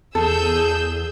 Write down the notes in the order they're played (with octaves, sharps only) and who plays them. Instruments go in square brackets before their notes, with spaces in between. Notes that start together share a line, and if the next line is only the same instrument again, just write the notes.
[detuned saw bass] E2 [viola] G#4 [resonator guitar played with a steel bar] A4 [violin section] E6 G6